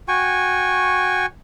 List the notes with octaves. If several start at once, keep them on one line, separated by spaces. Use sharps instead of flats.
F#4 G5 G#5 C#6